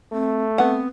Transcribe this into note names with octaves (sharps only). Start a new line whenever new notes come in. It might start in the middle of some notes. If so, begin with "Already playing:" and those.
A3 C4
B3 C4 F#5